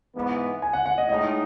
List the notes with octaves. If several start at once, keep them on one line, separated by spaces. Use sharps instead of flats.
G#2 E3 B3
G#5
F#5
F#5
D#5
A2 G#3 D#4 D#5